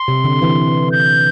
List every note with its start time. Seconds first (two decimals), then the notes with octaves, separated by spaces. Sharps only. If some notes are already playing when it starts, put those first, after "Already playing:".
Already playing: C6
0.08 C3
0.24 D3
0.42 E3
0.92 G6